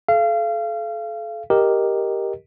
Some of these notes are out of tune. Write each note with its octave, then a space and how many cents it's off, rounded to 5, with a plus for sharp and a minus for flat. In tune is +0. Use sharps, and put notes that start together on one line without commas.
A4 -35 F5 -30
G4 +0 A#4 +0 D#5 +0